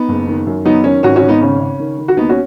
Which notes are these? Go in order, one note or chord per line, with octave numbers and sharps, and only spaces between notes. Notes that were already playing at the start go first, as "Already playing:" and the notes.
Already playing: B3 D#4
F#1
D#3
F#2
F#3 B3 D#4
D#3 C#4
G#1 C#4 F#4
C#4 F#4
G#1
B3 D#4
C#3 C#4
C#3
D#3
D#3
F#4
D#2 B3 D#4
C#4 F#4